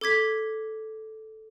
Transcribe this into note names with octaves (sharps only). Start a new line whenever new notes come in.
A4 D6 G#6 B6